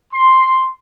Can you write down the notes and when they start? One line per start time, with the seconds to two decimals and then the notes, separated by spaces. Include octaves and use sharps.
0.13 C6